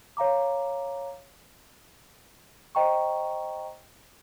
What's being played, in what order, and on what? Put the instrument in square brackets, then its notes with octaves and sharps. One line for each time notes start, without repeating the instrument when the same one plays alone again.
[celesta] C#5 F5 A#5 D6
C5 D#5 G5 A#5 C#6